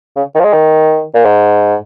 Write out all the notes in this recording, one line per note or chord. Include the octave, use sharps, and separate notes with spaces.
C#3
D#3
F3
G#3
D#3
A#2
G#2